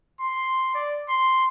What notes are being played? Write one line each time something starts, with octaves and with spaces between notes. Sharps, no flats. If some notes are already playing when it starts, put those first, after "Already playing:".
C6
D5
C6